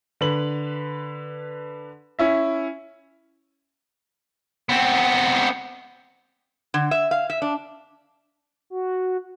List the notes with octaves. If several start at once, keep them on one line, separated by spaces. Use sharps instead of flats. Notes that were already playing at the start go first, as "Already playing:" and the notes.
D3 B4 F#7
C#4 E4 E5
B3 C4
D3
E5
F5
E5
D4
F#4